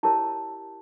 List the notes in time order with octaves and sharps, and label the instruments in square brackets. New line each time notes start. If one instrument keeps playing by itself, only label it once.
[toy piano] E4 G4 A#4 C#5 A5